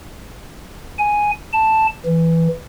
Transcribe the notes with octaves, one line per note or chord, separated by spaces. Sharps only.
G#5
A5
E3